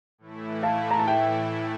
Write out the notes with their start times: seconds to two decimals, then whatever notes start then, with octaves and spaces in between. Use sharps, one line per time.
0.18 A2 E3 A3 E4
0.63 F5 A5
0.91 A#5
0.99 A5
1.07 E5 G5